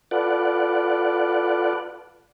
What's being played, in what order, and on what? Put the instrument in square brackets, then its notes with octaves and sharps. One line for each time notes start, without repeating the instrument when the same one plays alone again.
[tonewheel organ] F4 A4 B4 D5 F#5